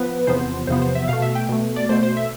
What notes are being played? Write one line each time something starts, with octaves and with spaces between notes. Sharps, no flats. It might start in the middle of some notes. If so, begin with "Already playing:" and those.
Already playing: F3 B3 B4
E2 C3 F3 B3 C5
E2 C3 F3 B3 C5
C5
E5
B2 A3 F5
E5
G5
B2 A3
D5
B2 A3 C5
C5
E5